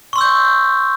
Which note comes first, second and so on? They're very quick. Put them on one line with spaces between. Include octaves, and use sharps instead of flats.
C#6 C6 E6 G6